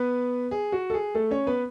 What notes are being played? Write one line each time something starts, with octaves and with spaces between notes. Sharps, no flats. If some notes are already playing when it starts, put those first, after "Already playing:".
Already playing: B3 B4
G#4
F#4
A4
G#4
A3 A4
C#4 C#5
B3 B4